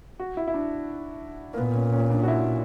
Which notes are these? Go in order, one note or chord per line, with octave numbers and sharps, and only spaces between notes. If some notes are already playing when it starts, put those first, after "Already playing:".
F#4
E4
E4
D4
A#3
A#2 B3
C#4
C#4
D4
F#4
E4